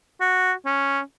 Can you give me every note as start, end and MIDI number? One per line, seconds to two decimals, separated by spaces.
0.21 0.53 66
0.66 1.01 61